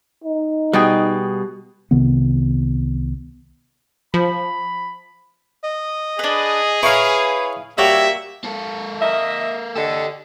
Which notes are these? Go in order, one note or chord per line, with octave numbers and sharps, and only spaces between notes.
D#4
B2 G3 G#4 G5
C2 C3 D#3 B3
F3 B5
D#5
D4 G#4 B4
E4 B4 C#5 F5 A#5 C#6
G3 A#3 F#4 C#5 E5 G5
A#3 A4
A#4 D#5 E5
D3 G4 A4 D#5